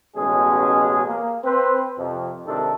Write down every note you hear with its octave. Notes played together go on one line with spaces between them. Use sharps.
A1 B2 G#3 C#4 G#4
A#3
C4 B4 C5
F2 C3
G#1 C3 D#3 D4 D#4 A4